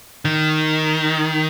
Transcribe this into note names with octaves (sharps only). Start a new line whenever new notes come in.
D#3